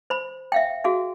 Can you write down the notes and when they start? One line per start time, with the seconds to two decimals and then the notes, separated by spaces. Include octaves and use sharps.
0.10 C5 B5
0.52 E5 F5 G5
0.84 F#4 G#4 F5